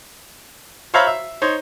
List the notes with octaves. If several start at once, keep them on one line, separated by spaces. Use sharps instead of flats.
C5 C#5 E5 F5 A#5 B5
E5
D#4 C5 C#5